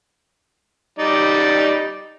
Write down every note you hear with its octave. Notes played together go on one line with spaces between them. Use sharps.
G3 D#4 D5